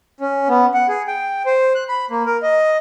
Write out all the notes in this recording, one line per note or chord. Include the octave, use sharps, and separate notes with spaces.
C#4
B3
F#5
G#4
G5
C5
F#6
B5
A#3
A#4
D#5